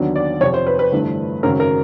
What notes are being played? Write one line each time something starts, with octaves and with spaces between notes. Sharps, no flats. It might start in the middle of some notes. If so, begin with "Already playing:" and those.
Already playing: D#2 D3 F#3 B3 D4
D5
F2 C3 F3 C#5
C5
B4
B4
G1 G2 E3 A3
G#1 F#2 C#3 F#3 A#4
A#4